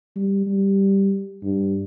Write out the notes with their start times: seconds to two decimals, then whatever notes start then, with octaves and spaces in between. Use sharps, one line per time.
0.16 G3
0.46 G3
1.42 G2